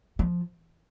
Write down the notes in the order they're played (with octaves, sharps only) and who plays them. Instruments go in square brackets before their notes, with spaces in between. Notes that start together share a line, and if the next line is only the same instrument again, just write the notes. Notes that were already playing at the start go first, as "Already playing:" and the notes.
[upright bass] F3